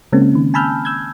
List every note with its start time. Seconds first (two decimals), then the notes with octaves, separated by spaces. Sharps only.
0.12 C#3 G#3 A#3 C4 C#4
0.35 D#3
0.54 G#5 A5 B5 E6 F6 G6
0.85 E6 G6 G#6